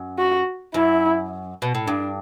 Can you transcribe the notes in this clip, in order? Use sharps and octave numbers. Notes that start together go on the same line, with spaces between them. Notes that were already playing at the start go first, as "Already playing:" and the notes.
Already playing: F#2
F#4
F#2 E4
B2
A2
G2 D4